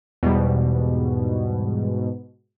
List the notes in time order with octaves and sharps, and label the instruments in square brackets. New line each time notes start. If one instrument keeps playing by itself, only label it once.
[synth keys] E2 G3 [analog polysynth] G#2 B2